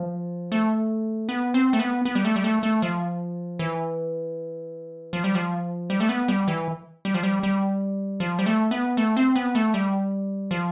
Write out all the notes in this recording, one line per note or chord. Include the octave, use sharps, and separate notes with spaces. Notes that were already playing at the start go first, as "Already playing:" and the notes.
Already playing: F3
A3
B3
C4
A3
B3
B3
G3
A3
G3
A3
A3
F3
E3
F3
G3
F3
G3
A3
B3
G3
E3
G3
F3
G3
G3
F3
G3
A3
B3
A3
C4
B3
A3
G3
F3